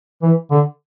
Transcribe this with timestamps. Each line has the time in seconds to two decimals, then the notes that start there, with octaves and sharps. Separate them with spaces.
0.22 E3
0.51 D3